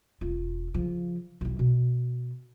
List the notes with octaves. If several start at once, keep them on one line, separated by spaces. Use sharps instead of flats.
E1 F4
C#3 F3
B1 E4
B2